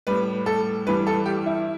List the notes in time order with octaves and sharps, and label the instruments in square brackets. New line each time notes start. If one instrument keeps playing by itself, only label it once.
[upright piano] A2 G3 B4
A4
G2 E3 G3 B4
A4
G4
E4